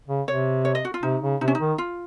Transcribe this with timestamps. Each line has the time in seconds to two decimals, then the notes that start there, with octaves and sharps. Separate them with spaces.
0.08 C#3
0.27 C3 C#5
0.65 C#5
0.75 D#5
0.85 F#4
0.94 F4
1.03 C3 D#4
1.22 C#3
1.41 C3 D#4
1.48 C#4
1.55 D#4
1.60 D#3
1.78 F4